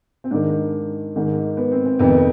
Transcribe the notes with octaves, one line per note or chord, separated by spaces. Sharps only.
C4
G#2 D#3 D4
G#2 D#3
B3
C4
C4
F2 C3 D#3 B3